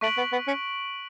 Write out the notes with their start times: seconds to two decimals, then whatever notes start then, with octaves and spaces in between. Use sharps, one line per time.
0.01 A3 C#6 F#6 B6 D7 F#7
0.17 B3
0.32 B3
0.47 C#4